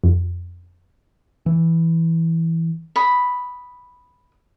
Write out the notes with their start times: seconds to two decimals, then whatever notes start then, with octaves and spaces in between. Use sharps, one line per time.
0.04 F2
1.46 E3
2.96 B5 D#6